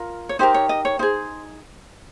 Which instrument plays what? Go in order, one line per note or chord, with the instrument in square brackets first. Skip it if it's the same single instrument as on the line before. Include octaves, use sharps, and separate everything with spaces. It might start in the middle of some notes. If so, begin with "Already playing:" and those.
Already playing: [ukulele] F4 A#4
C#5
D#4 G4 A#4 C5
C#5
D#5
C#5
D#4 G#4 C5